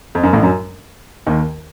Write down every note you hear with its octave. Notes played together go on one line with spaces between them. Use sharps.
F2
F#2
A1 A2
F#2 F#3
D#2 D#3